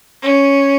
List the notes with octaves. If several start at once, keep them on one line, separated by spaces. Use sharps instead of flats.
C#4